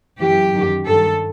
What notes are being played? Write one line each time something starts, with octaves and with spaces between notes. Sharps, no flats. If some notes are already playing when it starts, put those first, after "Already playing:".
F#2 E3 G4
F#2 D#3
G2 D#3 A4